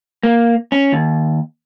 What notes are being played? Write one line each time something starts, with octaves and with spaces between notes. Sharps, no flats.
A#3
C#4
D#2